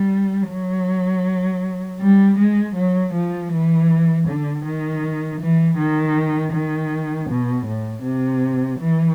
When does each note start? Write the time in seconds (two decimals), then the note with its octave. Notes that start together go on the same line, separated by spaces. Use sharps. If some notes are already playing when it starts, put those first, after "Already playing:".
Already playing: G3
0.49 F#3
2.00 G3
2.38 G#3
2.75 F#3
3.13 F3
3.50 E3
4.26 D3
4.64 D#3
5.39 E3
5.77 D#3
6.52 D#3
7.28 B2
7.65 A2
8.03 C3
8.79 E3